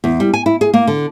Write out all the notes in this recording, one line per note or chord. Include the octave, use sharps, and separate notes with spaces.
E2
G3
G#5
E4
G#4
A#3
D3